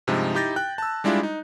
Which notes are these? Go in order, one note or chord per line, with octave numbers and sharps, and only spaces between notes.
G2 C3 F3 G#3 D#4
D#4 E4 G4 G6 A6 A#6
G5 F#6
A5 E6
G3 G#3 D4 E4 F4
D#4